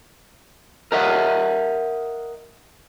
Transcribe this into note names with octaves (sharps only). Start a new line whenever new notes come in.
A#4 D#5 E5 F#5